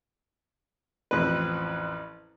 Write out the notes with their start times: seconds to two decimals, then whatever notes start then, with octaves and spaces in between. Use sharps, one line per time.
1.11 A1 F2 C4 B4